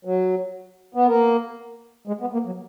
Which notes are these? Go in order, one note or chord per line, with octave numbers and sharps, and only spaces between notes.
F#3
B3
A#3
G#3
B3
A#3
F#3